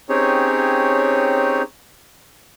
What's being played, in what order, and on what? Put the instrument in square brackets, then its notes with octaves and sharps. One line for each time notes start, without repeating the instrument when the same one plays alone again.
[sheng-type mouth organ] C4 C#4 D#4 G4 G#4 C#5